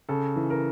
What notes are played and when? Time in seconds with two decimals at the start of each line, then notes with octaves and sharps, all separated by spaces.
0.09 C#3 A4
0.36 E3
0.50 A#4